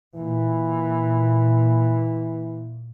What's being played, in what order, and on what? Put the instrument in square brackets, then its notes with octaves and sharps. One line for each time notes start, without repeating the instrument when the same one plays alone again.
[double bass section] A#2 [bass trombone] E3